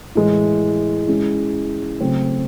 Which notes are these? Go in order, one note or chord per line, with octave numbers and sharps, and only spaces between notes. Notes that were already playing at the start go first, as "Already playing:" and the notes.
A2 E3 G#3
G#3 C#4 E4
C#3 F#3 A3 C4